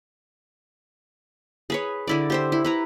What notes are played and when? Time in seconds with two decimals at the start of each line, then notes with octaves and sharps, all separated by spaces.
1.70 G#4 B4 C#5
2.07 D3 E4 D5
2.30 G4 C5 E5
2.52 E4
2.65 E4 B4 A#5